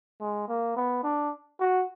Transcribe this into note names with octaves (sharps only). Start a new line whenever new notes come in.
G#3
A#3
B3
D4
F#4